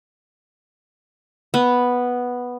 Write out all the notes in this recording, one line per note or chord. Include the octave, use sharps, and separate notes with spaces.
B3